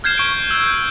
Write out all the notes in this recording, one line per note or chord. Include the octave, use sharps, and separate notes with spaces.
F6 G6 G#6 C7 E7
C#6 D7
E6 G6